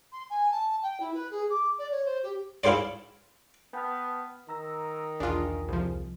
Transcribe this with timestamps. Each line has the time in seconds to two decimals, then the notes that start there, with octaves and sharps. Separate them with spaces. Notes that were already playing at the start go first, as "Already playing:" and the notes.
0.12 C6
0.30 G#5
0.51 A5
0.82 G5
1.00 E4
1.14 B4
1.30 G#4
1.50 D6
1.78 D5
1.91 C#5
2.05 C5
2.23 G4
2.64 E4 F4 G#4 C5 D5
3.73 B3 G5 A5 F6
4.49 D#3 A#5 E6 A#6
5.20 B1 E2 D4 F4 G#4
5.68 C2 F3